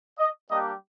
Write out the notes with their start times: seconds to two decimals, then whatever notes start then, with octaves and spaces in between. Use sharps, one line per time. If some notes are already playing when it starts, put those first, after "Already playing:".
0.19 D#5
0.51 G3 A#3 D4 G4 D#5